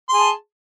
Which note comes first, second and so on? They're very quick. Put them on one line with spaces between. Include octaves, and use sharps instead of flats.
C6 G#4 A5